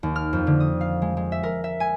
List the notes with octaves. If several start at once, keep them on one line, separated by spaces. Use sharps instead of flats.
D#2
F6
F2
D3
D#6
F5
G#3
G#3
E5
A#4
E5
G#5